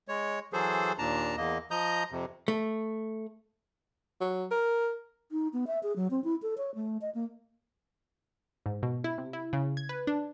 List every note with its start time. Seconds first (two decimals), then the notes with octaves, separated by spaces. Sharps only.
0.08 G#3 C#5
0.53 E3 F#3 G#4 A4 C5
0.98 D#2 A#2 D4 A5 A#5
1.37 E2 A#3 D#5
1.71 F3 D#5 A#5 D#6 G6
2.11 F2 C3
2.48 A3
4.21 F#3
4.51 A#4
5.32 D#4
5.53 B3
5.67 E5
5.83 G#4
5.96 F#3
6.11 C4
6.24 E4
6.42 A4
6.58 C#5
6.75 A3
7.02 D#5
7.15 A#3
8.66 G#2
8.83 B2
9.04 E4
9.18 C3
9.33 E4
9.53 C#3
9.77 G#6
9.89 B4
10.07 D4